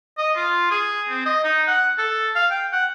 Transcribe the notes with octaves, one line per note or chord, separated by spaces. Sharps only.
D#5
F4
G#4
C4
D#5
D#4
F#5
A4
F5
G5
F#5